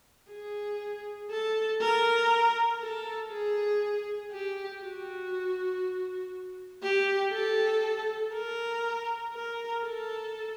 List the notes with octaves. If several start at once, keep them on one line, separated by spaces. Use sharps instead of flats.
G#4
A4
A#4
A4
G#4
G4
F#4
G4
A4
A#4
A#4
A4